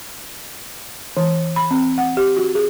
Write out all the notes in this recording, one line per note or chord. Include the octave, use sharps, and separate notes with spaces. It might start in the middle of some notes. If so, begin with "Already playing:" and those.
E3
B5
C4
F#5
G4
F#4
G#4